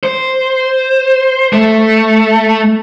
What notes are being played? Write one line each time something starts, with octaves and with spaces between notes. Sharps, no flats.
C5
A3